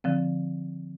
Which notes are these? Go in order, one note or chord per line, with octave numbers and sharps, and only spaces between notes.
D3 F3 C4